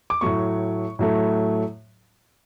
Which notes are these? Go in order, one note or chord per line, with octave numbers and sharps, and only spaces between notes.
D6
A2 F#3 A3 C#6
A2 F#3 A3